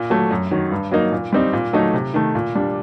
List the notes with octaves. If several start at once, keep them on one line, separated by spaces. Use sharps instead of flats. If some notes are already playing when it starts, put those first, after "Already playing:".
Already playing: A#2
F#3 A3
F#2
D#3 F#3
G2
F#3 A#3 D#4
A#2
G3 C4 D#4
A#2
F#3 A3 D#4
C3
D#3 A3
A#2
G3 D4